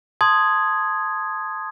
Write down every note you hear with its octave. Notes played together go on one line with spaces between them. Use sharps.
A5 C6 D#6 G#6